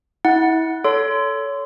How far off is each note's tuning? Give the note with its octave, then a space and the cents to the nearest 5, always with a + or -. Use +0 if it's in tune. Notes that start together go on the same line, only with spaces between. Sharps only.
E4 -35 F#5 +0
A4 +0 C#5 +20 C6 -20